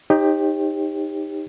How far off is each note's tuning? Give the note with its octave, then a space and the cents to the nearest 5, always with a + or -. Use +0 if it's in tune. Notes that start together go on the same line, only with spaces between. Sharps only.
D#4 +0 G4 +20 C#5 -45